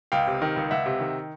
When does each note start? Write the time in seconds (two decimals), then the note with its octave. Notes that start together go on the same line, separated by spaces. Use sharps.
0.12 C#2 F5 G5
0.27 C3
0.42 D#3
0.56 C#2
0.71 C#2 E5 F#5
0.86 C3
1.00 D#3